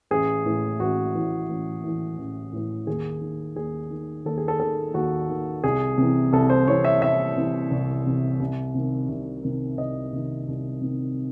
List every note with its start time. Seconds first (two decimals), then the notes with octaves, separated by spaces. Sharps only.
0.11 A1 G#4
0.45 A2 E3
0.80 A1 F#4
1.15 A2 E3
1.49 A1
1.84 A2 E3
2.18 A1
2.52 A2 E3
2.87 D#2 G#4
3.21 D#3
3.56 D#2 G#4
3.91 D#3
4.25 D#2 A4
4.38 G#4
4.48 A4
4.60 D#3 A4
4.94 D#2 F#4
5.29 D#3
5.64 C2 G#4
5.98 C3 E3
6.33 C2 A4
6.50 C5
6.67 C3 E3 C#5
6.85 E5
7.02 C2 E5
7.37 C3 E3
7.71 C2
8.06 C3 E3
8.40 C2
8.74 C3 D#3
9.09 C2
9.43 C3 D#3
9.78 C2 D#5
10.13 C3 D#3
10.48 C2
10.82 C3 D#3